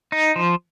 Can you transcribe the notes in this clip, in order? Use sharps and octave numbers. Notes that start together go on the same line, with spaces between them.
D#4
F3